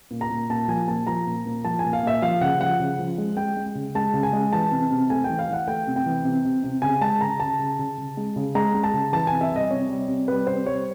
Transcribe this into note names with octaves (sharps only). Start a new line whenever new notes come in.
A#2
A#5
A#2
A#2 A5
F3 G#5
A#2 A5
F3 A#5
A#2
A#2
F3 A5
A#2 G#5
F5
A#2 E5
F3 F5
C#3 F#5
F3 F#5
C#3
F3
G#3
G#3 G5
G#3
C#3
G#3 A5
C#3
G#5
G#3
E3 A5
C3
C3
A3 G#5
G5
E3
F5
E3 F#5
A3 G5
C3
G5
E3
C3
C3
C3
C#3 G#5
G#3 A5
C#3 A#5
C#3 A5
C#3
C#3
C#3
G#3
C#3
G#3 A#5
G#3
A5
C#3
E3 A5
C3 G#5
E5
G3 D#5
C3 C#5
G3
C3
G3 B4
C3 C5
G3 C#5